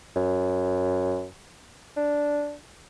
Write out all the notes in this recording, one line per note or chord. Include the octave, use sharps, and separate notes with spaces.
F#2
D4